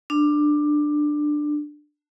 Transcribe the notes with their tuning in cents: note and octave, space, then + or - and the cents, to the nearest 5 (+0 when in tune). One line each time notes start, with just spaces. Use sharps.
D4 +15